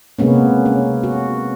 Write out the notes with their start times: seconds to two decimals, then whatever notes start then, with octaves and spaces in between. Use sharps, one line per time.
0.19 C3 G#3 A#3 B3 C#4
0.66 C#4
1.04 F#4